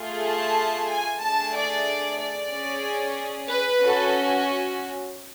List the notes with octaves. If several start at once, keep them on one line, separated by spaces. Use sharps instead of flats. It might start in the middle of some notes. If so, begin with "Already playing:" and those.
Already playing: A3 F4 G#4
A5
G#5
A3 D4 G#4 A5
D5
D5
C#4 G#4
B4
C#4 F#4 A4